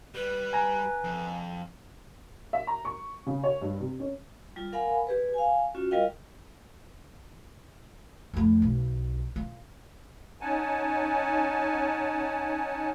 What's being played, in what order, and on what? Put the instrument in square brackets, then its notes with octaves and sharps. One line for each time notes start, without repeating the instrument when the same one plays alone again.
[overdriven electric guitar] G3 [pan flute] B4
[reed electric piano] G#5 A#5
[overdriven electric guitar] F2
[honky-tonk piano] E5
A#5
C#6
C#3
C#5
G2
C3
C#4
[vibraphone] G3 F4
A#4 F5 F#5 G#5 B5
G4 G#4 B4
F5 G#5
C#4 F4 F#4
G3 F4 A#4 D#5 F5 G5
[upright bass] F2 A2
B1
F4
[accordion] C#4 D#4 F#5 G#5 A5